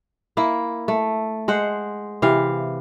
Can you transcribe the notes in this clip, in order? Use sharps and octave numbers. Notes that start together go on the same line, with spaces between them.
A#3 E4
A3
G#3 C5 F#5
C3 E3 F5